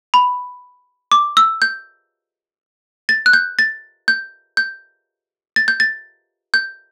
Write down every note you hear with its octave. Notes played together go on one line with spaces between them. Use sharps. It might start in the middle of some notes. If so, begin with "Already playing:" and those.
B5
D6
E6
G6
A6
F#6
G6
A6
G6
G6
A6
G6
A6
G6